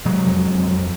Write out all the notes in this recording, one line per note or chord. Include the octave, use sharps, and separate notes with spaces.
C3 F#3 G#3
F2
F2
F2